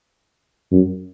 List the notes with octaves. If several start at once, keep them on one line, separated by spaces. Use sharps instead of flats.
F#2